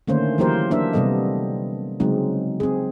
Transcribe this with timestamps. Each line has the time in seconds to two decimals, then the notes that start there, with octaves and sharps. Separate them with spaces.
0.07 D3 D#3 A3 A#3 C#4 C5
0.38 E3 F#3 A#3 G4 A#4 C5
0.71 A#3 D4 C5 E5
0.93 C3 G3 B3 A4 D#5
2.00 C#3 F#3 G#3 C4 D#4
2.60 C4 G#4